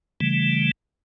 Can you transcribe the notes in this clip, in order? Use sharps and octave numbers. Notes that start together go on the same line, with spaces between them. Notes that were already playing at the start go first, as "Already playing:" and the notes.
C#3 E3 G3 A3